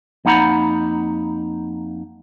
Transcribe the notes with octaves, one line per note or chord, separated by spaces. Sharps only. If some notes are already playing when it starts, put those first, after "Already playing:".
F2 A#3 D#4 F#5 A#5 B5